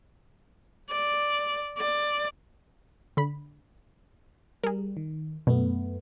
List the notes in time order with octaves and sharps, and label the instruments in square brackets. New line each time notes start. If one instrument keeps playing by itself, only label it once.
[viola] D5
D5
[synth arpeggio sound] D3 B5
[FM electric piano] G3 [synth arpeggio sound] G#4 A#4
[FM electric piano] D#3
[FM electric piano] F#2 A3 B3 [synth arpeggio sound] B2